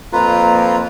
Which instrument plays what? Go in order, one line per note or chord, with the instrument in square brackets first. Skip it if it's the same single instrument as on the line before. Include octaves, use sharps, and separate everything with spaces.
[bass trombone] F2 [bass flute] A#3 [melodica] F4 B4 [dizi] A#5